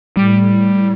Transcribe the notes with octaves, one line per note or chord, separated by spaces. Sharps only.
A2 G3